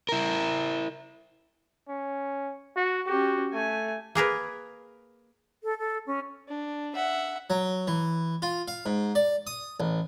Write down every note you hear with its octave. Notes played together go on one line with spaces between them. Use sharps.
E4 A#4
C#4
F#4
C#4 F#4 G4
A3 G#5
A#3 G#4 A#4 B4
A4
A4
C#4
D4
E5 F#5
F#3
E3
F4
F5
G#2
D5
D#6
A1